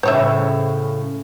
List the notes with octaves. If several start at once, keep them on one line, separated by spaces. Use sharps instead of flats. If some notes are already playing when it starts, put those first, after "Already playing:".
A2 C#3 C5 C#5 E5